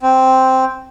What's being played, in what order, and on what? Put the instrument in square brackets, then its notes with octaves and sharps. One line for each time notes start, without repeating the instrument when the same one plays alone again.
[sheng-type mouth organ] C4